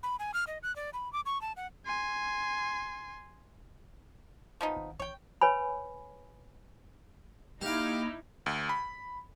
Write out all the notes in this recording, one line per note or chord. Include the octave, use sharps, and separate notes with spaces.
B5
G#5
F6
D#5
F#6
D5
B5
D6
C#6
A5
F#5
G#5 C6
F3 B3 D#4
G#1
A1 C#5 G5
B4 C#5 G#5 B5
A#3 D#4 E4 G4 F5 D6 F6
D2
B5